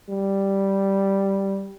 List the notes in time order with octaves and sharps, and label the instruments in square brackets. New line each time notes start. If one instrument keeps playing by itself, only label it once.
[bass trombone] G3